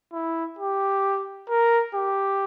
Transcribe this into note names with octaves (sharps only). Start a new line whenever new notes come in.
E4
G4
A#4
G4